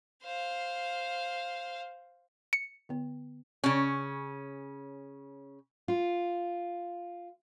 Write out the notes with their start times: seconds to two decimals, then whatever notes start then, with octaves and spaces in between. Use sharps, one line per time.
0.24 C5 F5
2.53 C#7
2.89 D3 B3
3.64 C#3 C#4
5.88 F4